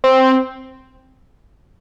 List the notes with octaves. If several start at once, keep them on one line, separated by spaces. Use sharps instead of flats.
C4